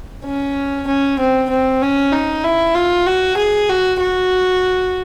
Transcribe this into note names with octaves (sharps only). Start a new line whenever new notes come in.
C#4
C#4
C4
C4
C#4
D#4
E4
F4
F#4
G#4
F#4
F#4